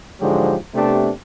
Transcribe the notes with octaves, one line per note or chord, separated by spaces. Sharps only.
G#2 D3 F3 F#3 G#3 G4
C3 A3 B3 D4 G4